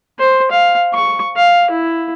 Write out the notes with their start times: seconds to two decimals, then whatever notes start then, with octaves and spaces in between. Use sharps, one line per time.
0.19 C5
0.51 F5
0.93 C#6
1.36 F5
1.71 E4